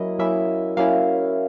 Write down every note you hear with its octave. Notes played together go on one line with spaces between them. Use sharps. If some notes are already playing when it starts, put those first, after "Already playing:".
Already playing: F#3 A#3 C#4 E4 D#5
F#3 A#3 C#4 E4 E5
F#3 A#3 C#4 E4 F5